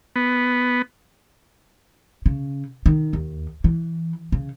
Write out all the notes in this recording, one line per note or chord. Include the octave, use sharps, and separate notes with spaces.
B3
C#3
D#3
D#2
E3
C#3